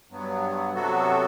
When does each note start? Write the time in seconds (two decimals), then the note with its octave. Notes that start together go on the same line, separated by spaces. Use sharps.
0.10 G2 F#3 B3
0.74 C3 F#3 B3 F#4 A4